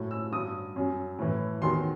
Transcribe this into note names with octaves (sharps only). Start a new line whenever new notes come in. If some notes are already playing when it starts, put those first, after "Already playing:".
Already playing: A2 F#3
E6
G2 F#3 D#6
F#2 F#3
A2 E3
E2 D#3 F#3 C6